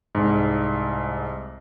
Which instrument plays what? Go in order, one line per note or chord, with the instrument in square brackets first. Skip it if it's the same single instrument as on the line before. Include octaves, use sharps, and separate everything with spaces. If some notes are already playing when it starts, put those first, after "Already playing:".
[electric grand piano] C2 G#2